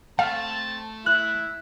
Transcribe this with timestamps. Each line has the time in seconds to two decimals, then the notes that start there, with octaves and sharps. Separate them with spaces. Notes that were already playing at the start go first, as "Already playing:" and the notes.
0.19 A3 C4 F5 A5
1.06 E4 F#6